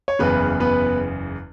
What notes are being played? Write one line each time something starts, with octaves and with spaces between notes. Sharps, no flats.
C#5
F#1 E2 C#3 B3 B4
B3 B4